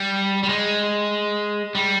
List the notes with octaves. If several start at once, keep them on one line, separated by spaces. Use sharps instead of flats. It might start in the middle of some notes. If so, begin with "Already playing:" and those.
Already playing: G3
G3
G#3
G3